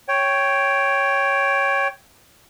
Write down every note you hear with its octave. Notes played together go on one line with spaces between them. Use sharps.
C#5 G5